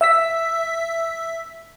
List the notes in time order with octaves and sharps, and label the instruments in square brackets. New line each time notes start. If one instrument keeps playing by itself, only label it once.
[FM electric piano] E5 E6 B6